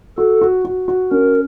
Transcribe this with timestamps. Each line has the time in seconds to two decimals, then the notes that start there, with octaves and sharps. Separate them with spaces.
0.17 F#4 A4
0.41 F#4
0.65 F#4
0.88 F#4
1.11 C#4 A#4